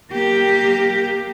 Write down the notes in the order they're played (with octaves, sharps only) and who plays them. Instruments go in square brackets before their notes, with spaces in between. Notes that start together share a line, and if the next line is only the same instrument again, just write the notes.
[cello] A#3 G4